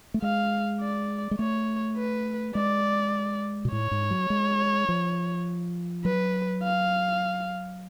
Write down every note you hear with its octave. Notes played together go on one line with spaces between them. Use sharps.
A3
G#3 F5
D5
G#3
A3 C#5
B4
G#3 D5
B2
A2 C#5
G#2
F#3
G#3
F3
F#3 B4
F5